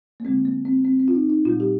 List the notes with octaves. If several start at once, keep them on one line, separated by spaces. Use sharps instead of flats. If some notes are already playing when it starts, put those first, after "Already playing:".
A#3
D3 G#3 C4
A#3
C4
C4
C4
F4
D#4
D#4
A#2 G3 F4
G4